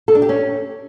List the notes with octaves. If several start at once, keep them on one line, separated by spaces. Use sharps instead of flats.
A4
D4
G4
C#4